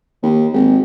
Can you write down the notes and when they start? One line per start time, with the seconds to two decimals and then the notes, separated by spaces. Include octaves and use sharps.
0.23 D#2
0.54 G#1